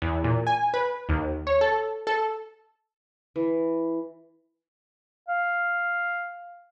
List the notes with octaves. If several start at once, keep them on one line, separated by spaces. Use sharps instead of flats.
E2
A#2
G#5
B4
D#2
C#5
A4
A4
E3
F5